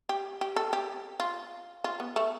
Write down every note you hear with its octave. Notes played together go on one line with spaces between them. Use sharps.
G4
G4
A4
G4
F4
F4
B3
A3